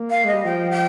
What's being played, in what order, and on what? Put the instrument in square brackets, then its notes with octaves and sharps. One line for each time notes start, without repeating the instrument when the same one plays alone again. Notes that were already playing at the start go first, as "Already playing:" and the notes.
Already playing: [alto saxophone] A#3
[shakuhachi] F5
[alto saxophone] G#3 [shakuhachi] D#5
[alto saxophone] G3
[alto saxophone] F3 [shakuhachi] G5
[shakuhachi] G5